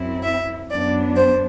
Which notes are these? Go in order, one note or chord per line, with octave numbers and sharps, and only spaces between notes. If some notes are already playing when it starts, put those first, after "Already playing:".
Already playing: F#2 F#3 C4 E4
E5
F#2 F#3 B3 D4 D5
C5